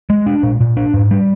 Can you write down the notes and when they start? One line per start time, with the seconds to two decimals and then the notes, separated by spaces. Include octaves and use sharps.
0.10 G#3
0.26 D4
0.43 A#2
0.61 A#2
0.77 D4
0.94 G#2
1.11 G3